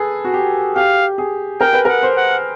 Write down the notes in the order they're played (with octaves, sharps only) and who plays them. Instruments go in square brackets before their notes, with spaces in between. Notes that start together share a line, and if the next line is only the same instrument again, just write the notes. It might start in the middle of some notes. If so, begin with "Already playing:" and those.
Already playing: [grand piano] G#4 A4 B4
F#4
G4
[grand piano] G4 [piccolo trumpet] F5
[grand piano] G#4
[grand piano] A#4 [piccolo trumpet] G5
[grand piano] B4
[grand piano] A#4 [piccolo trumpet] F#5
[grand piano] C5
[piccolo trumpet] F#5